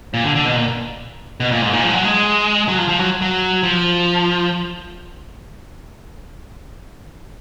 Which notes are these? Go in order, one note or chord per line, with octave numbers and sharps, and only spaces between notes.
A#2
D3
D3
B2
A#2
B2
A#2
G#2
A#2
F3
G#3
F#3
G#3
F#3
F3
F3
F#3
F#3
F3